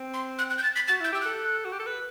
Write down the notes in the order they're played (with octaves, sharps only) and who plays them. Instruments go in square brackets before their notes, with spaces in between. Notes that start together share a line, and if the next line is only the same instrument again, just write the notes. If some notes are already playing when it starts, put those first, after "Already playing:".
Already playing: [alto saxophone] C4
[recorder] C6
F#6
F#6
G6
A6
B6
[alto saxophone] F#4 [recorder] A6
[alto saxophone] E4
[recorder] G6
[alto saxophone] G4 [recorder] E6
[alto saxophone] A4 [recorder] F#6
[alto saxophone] F#4
G4
A4
B4